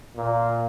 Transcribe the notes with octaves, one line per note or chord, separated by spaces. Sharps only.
A#2